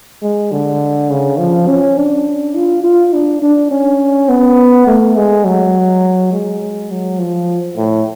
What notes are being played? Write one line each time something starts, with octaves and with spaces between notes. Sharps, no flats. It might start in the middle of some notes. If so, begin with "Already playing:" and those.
G#3
D3
C#3
F3
C#4
D4
F4
F4
D4
D4
C#4
B3
A3
G#3
F#3
G#3
F#3
F3
A2